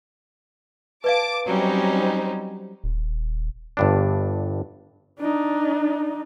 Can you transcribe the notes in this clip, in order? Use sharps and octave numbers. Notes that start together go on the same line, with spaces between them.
B4 D5 F5 A5 D6 D7
F#3 G3 C4 C#4 D#4
D#1
G1 G2 D4
D4 D#4